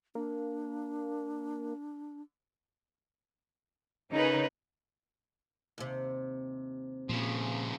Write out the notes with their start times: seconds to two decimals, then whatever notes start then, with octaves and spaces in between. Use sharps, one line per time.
0.15 A#3 D4
4.13 C#3 C#4 D#4 A#4 B4
5.78 D#2 C3
7.09 A#2 C#3 F3